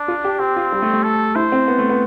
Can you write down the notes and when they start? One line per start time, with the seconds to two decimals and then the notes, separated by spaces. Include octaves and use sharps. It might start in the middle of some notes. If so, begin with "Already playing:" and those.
Already playing: D4
0.08 F4
0.24 G4
0.39 C4 G4
0.56 F4
0.72 G3
0.82 A3
0.93 A3
1.03 A4
1.35 E4 C5
1.52 C4
1.68 B3
1.78 A3
1.89 B3